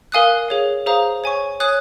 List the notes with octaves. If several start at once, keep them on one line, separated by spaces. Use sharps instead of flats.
A#4 F5 G#5 D#6 F#6
G#4 C#5 F5
G#4 C5 F5 A#5 D#6
C#5 G#5 C#6
C#5 G#5 D#6 F#6